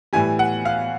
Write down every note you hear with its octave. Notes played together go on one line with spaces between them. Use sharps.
A2 E3 G3 G#5
F#5
F5